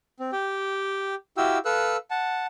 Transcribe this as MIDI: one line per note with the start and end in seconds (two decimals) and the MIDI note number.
0.20 0.31 60
0.32 1.15 67
0.32 1.15 79
1.37 1.58 64
1.37 1.58 66
1.37 1.58 67
1.37 1.58 77
1.37 1.58 79
1.37 1.58 88
1.65 1.97 69
1.65 1.97 71
1.65 1.97 77
1.65 1.97 88
1.65 1.97 90
2.11 2.46 78
2.11 2.46 81